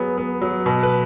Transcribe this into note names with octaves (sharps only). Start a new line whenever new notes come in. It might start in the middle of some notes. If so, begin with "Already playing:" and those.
Already playing: F#3 B3 G#4
B3
F#3
B2
B4